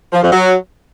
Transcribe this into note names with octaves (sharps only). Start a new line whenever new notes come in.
F3
F2
F#3